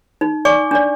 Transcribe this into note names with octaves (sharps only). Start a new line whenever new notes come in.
D#4
D5 G#5 C#6 D6
D4 D5